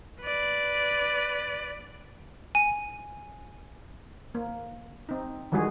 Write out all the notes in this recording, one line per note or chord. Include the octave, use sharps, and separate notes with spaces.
B4 D5
G#5
A#3
C4 D#4
D#3 E3 G3 G#3 F#4 G#4